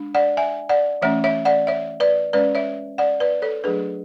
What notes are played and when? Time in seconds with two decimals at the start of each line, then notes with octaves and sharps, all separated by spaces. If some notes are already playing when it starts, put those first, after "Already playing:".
Already playing: G#3 D4
0.15 D5 F#5
0.37 E5 G#5
0.69 D5 F#5
1.02 E3 A3 C#4 C#5 E5
1.24 C#5 E5
1.45 D5 F#5
1.67 C#5 E5
2.00 B4 D5
2.33 G#3 C#4 B4 D5
2.55 C#5 E5
2.98 D5 F#5
3.20 B4 D5
3.42 A4 C#5
3.64 F#3 A3 D4 G#4 B4